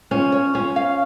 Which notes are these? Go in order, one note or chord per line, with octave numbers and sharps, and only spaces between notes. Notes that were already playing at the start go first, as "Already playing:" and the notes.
C#4 F4
C#5
C#4 F4
F5